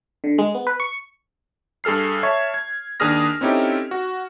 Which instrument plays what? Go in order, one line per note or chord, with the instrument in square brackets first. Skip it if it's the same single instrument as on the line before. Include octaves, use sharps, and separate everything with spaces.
[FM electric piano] D3
G#3
B3
B4
C#6
[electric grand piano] G2 G#4 A4 F6 C7
C#5 E5 A5 C#6 G#6
G#6
D#2 D4 G#4 D#6 F6 A#6
C4 C#4 D#4 E4 G4 A4
F#4